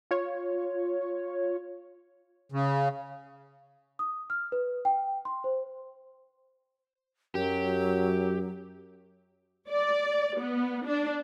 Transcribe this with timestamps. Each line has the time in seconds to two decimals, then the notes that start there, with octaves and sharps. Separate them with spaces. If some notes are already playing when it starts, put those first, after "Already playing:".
0.11 F4 C#5
2.52 C#3
3.99 D#6
4.30 F6
4.52 B4
4.85 G5
5.25 C6
5.44 C5
7.35 F#2 F#3 G4
9.70 D5
10.39 B3
10.87 D4